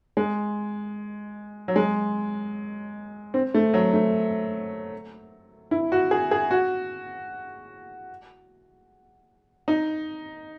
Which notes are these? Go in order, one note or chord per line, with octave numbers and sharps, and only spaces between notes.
G#3
F#3
G#3
C4
A3
F#3
A3
E4
F#4
G#4
G#4
F#4
D#4